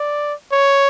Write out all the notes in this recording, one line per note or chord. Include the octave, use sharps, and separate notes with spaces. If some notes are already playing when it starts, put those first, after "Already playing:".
Already playing: D5
C#5